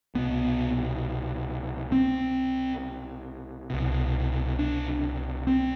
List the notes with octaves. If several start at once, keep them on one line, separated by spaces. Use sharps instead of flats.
C2 B2 B3
C4
C2 B2
D4
C4